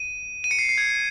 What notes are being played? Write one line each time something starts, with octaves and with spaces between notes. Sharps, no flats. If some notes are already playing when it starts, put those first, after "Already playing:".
Already playing: D#7
D#7
C#7
C7
C7
G#6